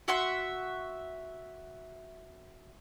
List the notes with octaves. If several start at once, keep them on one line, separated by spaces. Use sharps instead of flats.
F#4 E5 F#5 C6